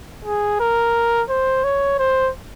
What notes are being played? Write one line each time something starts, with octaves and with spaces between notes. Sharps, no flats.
G#4
A#4
C5
C#5
C5